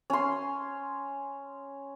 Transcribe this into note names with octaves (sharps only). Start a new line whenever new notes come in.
C#4 C6